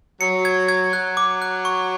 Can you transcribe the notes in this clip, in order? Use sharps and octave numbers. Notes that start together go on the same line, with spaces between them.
F#3 C#7
G#6
G#6
F#3 F#6
D6
F#6
C#6